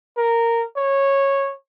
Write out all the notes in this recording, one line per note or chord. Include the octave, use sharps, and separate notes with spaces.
A#4
C#5